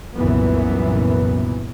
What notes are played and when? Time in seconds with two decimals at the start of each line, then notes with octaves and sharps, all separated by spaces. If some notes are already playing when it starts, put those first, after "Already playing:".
0.18 C2 F#2 A#2 E3 B3